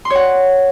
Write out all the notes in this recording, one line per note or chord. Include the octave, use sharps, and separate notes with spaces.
C6
C#5
F#5